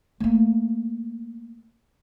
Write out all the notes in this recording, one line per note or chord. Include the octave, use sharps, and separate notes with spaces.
A3 A#3